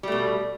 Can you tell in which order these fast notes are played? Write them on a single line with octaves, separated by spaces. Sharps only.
G3 A3 B2